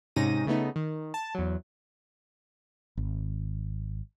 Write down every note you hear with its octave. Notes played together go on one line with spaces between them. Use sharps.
G#2 C3 C#4 D#4 A#6 D#7
C#3 A3 B3 D#4
D#3
A5
E2 F#3
G#1